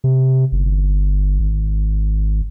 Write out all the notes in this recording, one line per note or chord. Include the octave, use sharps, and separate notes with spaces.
C3
G1
G#1